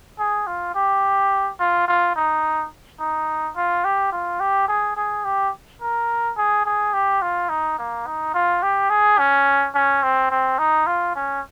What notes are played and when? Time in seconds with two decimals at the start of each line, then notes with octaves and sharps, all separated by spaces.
0.19 G#4
0.47 F4
0.75 G4
1.60 F4
1.88 F4
2.16 D#4
3.00 D#4
3.56 F4
3.84 G4
4.12 F4
4.40 G4
4.68 G#4
4.97 G#4
5.25 G4
5.81 A#4
6.37 G#4
6.65 G#4
6.94 G4
7.22 F4
7.49 D#4
7.78 A#3
8.06 D#4
8.34 F4
8.63 G4
8.90 G#4
9.19 C#4
9.75 C#4
10.03 C4
10.30 C4
10.59 D#4
10.87 F4
11.15 C#4